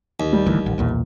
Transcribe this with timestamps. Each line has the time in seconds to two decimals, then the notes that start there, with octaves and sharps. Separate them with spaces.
0.20 D#2
0.33 G3
0.46 D#1 D2 E3
0.66 A1
0.78 B1 E2 A#2